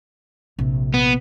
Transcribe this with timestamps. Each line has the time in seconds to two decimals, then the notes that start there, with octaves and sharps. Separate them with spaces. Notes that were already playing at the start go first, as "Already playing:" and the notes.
0.59 A#1 C3
0.94 B3